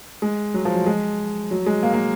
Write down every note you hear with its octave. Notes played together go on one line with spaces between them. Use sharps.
G#3
F#3
F3
F#3
G#3
F#3
G#3
A#3
A#3